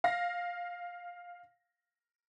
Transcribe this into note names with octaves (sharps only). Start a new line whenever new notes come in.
F5 A#6